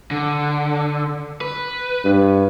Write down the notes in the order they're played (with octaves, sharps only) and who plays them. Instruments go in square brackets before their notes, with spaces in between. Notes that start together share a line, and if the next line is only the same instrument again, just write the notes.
[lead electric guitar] D3
B4
[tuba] G2